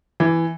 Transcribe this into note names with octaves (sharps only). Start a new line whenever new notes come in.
E3